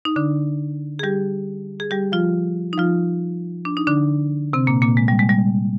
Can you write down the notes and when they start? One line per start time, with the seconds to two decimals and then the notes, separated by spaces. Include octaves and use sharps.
0.05 D#4
0.16 D3 D4
0.99 G#4
1.03 G3 G4
1.80 G#4
1.91 G3 G4
2.12 F3 F4
2.73 D#4
2.78 F3 F4
3.65 D4
3.77 D#4
3.87 D3 D4
4.53 C3 C4
4.67 A#2 A#3
4.82 A#2 A#3
4.97 G#3
5.08 G3
5.19 G#3
5.29 G3